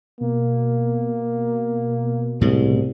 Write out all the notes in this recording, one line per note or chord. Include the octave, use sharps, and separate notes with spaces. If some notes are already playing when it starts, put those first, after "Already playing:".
B2 A#3
C2 A2 G#3